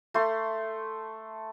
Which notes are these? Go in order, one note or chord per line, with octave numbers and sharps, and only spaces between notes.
A3 C6